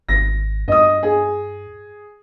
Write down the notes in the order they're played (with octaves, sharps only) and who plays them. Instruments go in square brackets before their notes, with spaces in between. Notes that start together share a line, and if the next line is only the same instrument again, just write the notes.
[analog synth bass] G#1 [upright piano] A#6
[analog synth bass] G2 [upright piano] D#5 D#6
[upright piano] G#4